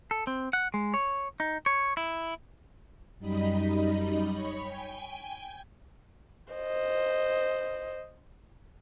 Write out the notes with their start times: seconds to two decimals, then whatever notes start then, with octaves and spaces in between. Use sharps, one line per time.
0.11 A4
0.27 C4
0.53 F#5
0.74 G#3
0.94 C#5
1.40 D#4
1.66 C#5
1.97 E4
3.19 F#2 G3 D#4 D#5 B5
4.31 C#5 B5 C#6
4.63 G5 G#5
6.54 C5 D#5